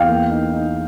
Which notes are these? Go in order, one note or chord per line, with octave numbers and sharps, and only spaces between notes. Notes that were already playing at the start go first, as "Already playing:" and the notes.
Already playing: E2 F5 G5
A#3
D#4
D#4